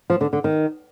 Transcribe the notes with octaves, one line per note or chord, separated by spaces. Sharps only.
F3
D3
D3
D#3